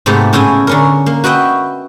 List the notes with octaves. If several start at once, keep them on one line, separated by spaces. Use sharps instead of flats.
G#2 C3 A3 B3 G4
A2 C#3 E4 G5 G#5
D3 C#4 A#4
A#3
F#4 B4 D#5 E5 G5